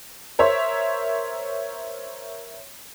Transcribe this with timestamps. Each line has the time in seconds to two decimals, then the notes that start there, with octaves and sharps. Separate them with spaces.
0.39 A#4 C5 C#5 E5